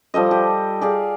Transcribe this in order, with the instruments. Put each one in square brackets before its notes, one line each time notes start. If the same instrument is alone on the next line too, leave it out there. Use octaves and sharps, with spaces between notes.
[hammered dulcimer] F3 G3 A4 D#5
G4
G#4 D5 F5